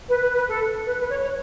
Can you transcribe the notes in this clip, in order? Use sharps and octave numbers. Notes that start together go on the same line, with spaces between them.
B4
B4
B4
A4
B4
B4
C#5
C#5